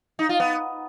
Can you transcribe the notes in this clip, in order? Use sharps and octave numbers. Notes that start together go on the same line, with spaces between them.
D#4
F4
B3